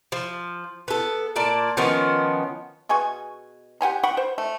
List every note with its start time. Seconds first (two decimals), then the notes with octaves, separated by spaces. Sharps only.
0.12 F3
0.88 B3 A4
1.36 A#2 A#3 D5 A5
1.77 D#3 F3 B3 C#4
2.89 B2 G#4 G#5 C#6
3.81 G4 F#5 G#5 A#5
4.03 F#5 G5 B5 C#6
4.17 C5
4.38 A3